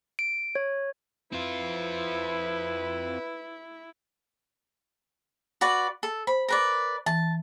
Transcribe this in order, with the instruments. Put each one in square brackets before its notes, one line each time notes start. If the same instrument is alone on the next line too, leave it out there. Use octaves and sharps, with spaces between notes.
[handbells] D7
C#5
[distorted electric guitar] C4 F4 [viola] E4 [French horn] B4
[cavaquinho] F#4 B4 D5
A4
[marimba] C5 [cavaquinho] B5
[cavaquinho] A#4 B4 D5
[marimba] E3 [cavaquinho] A5